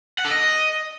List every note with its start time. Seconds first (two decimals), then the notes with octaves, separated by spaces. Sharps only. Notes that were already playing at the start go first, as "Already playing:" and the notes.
0.18 F#5
0.25 A4
0.31 D#5